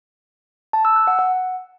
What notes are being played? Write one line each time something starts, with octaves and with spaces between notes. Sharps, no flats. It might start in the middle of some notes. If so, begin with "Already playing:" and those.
A5
E6
F#6
F#5
F#5